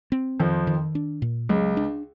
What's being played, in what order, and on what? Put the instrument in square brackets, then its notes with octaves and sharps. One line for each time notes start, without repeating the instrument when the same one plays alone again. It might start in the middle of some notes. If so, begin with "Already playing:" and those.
[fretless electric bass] C4
[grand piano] F2 F3 [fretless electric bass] D#3
[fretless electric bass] D#3
D4
A#2
[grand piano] C#2 C#3 [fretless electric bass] F#3
[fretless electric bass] D4